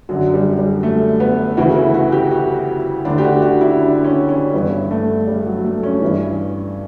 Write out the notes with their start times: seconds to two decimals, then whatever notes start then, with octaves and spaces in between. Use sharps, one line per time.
0.09 F#2 D3 F#3
0.34 G3
0.59 G3
0.83 A3
1.20 B3
1.57 D2 C#3 E3 F#4
1.76 E4
1.94 F#4
2.12 G4
2.31 F#4
3.05 D2 D3 D4
3.18 G4
3.24 F#4
3.42 F#4
3.61 E4
3.80 D4
4.04 C#4
4.29 C#4
4.54 G2 E3 B3
4.91 A3
5.27 G3
5.46 F#3
5.64 A3
5.83 C#4
6.02 G2 E3